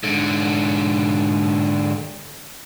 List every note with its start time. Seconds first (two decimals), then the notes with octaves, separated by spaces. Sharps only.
0.04 G#2 D3